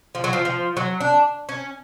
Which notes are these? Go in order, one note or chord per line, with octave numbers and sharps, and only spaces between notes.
F3
F#3
F3
F3
F#3
D4
C#4